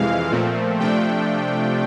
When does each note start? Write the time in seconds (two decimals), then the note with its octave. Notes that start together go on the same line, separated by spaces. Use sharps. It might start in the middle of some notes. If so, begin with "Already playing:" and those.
Already playing: F2 C3 E3 G#3 F5
0.31 A#2 F3 A3 C4
0.79 C3 F3 A3 D4 G5